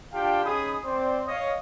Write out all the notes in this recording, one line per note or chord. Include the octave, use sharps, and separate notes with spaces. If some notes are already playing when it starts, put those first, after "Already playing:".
D4 F4 G4 F5 G5 A5
C#4 D#4 G#4 B5 D#6
C4 C5 D5
C#5 D#5 F5